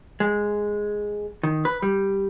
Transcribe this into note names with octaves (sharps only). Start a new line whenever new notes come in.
G#3
D#3
B4
G3